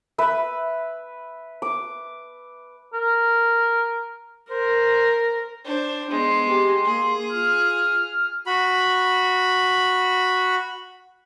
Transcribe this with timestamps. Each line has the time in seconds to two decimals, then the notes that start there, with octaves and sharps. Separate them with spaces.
0.18 B4 E5
1.62 D6
2.93 A#4
4.50 A#4 C5
5.65 D4 C5
6.10 G#3 B3 C6
6.49 G4
6.85 A#3 G#4
7.29 F4 F6
8.46 F#4 B5